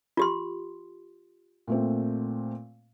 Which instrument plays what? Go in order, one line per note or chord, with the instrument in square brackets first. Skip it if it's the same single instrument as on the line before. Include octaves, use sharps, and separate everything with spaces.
[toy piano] F4 G4 C6
[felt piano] A#2 A3 C4